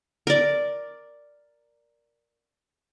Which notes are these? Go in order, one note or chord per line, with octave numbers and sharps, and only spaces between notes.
A#4 D5